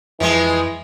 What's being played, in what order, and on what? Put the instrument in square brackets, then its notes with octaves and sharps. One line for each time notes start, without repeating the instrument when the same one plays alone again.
[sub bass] F2 [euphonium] E3 [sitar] F3 G#3